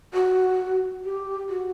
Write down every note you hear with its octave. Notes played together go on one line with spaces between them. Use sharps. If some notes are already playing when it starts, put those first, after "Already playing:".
F#4
G4
F#4